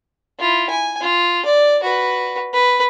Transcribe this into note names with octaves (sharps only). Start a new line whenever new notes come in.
E4 F4
G#5
F4
D5
F#4 B4
B4